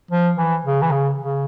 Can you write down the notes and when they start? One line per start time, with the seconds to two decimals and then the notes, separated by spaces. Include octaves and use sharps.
0.11 F3
0.37 E3
0.65 C#3
0.82 E3
0.91 C#3
1.18 C#3